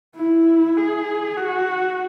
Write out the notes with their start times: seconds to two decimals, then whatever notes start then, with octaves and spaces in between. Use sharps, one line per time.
0.16 E4
0.77 G#4
1.37 F#4